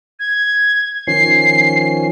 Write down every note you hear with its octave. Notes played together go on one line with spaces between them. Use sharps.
G#6
D#3 F3 C#4 C7